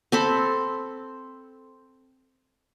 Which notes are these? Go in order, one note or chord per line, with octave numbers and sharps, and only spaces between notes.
C4 A4 B5